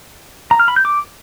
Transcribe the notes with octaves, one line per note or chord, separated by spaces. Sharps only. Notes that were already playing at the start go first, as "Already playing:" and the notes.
A#5
F6
B5
G6
D6